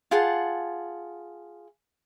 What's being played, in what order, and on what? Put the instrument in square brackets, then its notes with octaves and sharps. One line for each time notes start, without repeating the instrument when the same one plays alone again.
[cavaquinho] F4 G#4 F#5 A5